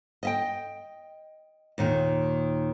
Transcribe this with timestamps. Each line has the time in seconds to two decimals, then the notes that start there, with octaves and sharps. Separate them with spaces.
0.23 D#5 E5 G5
1.78 D#2 A#2 D#3